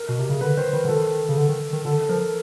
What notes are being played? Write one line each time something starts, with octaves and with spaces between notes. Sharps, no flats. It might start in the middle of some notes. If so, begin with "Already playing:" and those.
Already playing: A#4
B2
C3
C#3
D3 B4
D#3 C5
D#3 B4
D3
D#3 A4
C#3
D3
D#3
D#3
D3 A4
F3 A#4